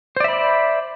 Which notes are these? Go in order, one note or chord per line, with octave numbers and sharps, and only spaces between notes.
C5 D5 E5 B5